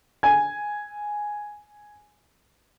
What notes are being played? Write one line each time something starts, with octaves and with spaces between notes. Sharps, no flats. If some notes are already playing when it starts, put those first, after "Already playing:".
G#5 G#6